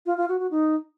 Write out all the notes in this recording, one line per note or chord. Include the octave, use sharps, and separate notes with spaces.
F4
F4
F#4
F#4
D#4